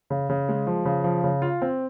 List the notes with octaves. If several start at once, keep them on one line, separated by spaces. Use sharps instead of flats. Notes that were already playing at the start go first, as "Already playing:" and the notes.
C#3
C#3
G#3
F3
C#3
F3
C#3
F4
C4